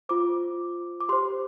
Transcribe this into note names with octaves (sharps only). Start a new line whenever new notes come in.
F4 C5 D6
D6
G4 C5 C6